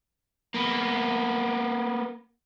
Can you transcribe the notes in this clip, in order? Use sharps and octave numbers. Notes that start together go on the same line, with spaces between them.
A#3 B3